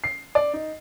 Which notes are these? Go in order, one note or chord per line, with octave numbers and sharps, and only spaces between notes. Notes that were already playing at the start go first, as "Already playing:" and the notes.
C7
D5
D#4